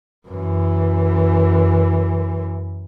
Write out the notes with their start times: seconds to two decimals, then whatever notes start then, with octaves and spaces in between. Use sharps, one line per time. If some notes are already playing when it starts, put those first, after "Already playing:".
0.28 F#2 E3